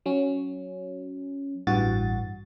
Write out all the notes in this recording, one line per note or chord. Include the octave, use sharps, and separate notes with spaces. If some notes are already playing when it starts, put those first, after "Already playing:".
F#3 C#4
A1 G2 E3 F#4 A6